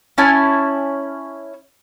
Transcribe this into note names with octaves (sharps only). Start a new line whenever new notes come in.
C#4 E4 G#5 A5